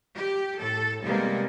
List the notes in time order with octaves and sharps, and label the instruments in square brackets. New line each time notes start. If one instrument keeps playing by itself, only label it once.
[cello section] G4
A2 A4
C3 G3 G#3 A#3 B3